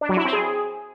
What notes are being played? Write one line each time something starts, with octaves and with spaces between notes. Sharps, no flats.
D4
F#3
E4
C4
G#4